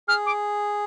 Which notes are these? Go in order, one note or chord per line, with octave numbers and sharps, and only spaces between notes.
G#4 F6
D6